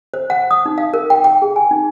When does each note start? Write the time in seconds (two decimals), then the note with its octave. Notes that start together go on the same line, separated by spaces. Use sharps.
0.14 C5
0.30 F#5
0.51 D#6
0.66 D#4
0.78 F5
0.94 A#4
1.10 G5
1.24 G5
1.42 G#4
1.56 G#5
1.71 D#4